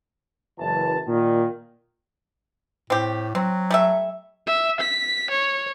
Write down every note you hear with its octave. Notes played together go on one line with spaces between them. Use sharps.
F#1 E3 A5
A#2 D#3
A2 C4 G4
F#3 C4
G3 A3 E5
E5
B6
C#5